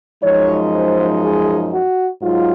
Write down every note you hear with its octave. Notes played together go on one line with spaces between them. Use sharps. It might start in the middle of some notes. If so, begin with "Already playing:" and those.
F#2 F3 G#3 D#4 C#5
C5
G#4
F#4
G#2 F#3 F4